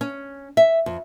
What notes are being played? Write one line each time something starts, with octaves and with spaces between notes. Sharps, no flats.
C#4
E5
F2